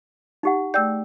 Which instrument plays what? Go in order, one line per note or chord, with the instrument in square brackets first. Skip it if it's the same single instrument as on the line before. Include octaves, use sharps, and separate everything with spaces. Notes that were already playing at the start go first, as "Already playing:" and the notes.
[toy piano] D#4 G4 F#5
[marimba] A3 E6 G6 [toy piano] G#4 D5 G5